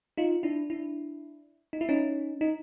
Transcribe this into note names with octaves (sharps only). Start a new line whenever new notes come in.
D#4 F4
D4 E4
D4 E4
D#4
E4
C#4 D#4
D#4